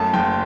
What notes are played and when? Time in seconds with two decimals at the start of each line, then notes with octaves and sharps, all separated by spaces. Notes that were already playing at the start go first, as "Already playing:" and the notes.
Already playing: F#2 A3 A5
0.13 F#1 G5